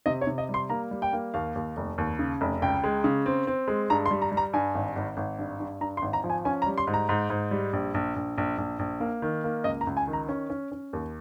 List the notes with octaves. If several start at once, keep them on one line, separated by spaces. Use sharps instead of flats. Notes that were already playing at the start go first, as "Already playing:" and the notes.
C3 D#5
C#5
C3
D#5
G3
C6
A#3 A#5
G3
G5
A#3
D#2 F5
D#2
F1
D#2
C#3
F1
C#2 G5
G#3
C#3
C4
C4
G#3
G2 A#5
C6
G3
A#5
G3
A#5
G2 G#5
G#1
G#1
G#1
G2
G2
G2 A#5
C6
G#1
A#5
F3
G#5
C#4 G#5
A#5
G3
C6
G#2
A#5
G#2
G#2
G3
A#1
A#1
A#1
A#1
A#1
A#1
A#3
D#3
A#3
C#2 D#5
A#5
C#2
G#5
D#3
A#5
C#4
C#4
C#4
D#2